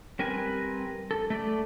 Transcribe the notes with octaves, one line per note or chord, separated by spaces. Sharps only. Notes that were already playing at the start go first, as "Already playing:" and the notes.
G3 C4 A#4 B4 G#5
A4
A3 A4 D5